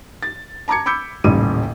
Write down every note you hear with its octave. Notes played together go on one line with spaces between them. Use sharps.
A6
A5 A#5 D6 G#6 C#7
B5 D6 E6 G6 C#7
D#1 A1 C#3 G3 D#7